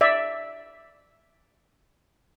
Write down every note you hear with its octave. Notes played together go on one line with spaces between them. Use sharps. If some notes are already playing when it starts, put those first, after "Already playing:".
D5 E5